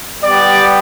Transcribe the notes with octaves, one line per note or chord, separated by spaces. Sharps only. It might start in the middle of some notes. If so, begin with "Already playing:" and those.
G3 B3 G4 D5